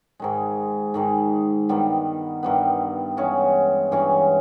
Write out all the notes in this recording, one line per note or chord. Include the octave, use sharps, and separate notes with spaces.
G#2 D#3 G#3
G#2 D#3 G#3
G2 D#3 G3 B3
G2 D#3 G3 B3
G2 E3 G#3 C#4
G2 E3 G#3 C#4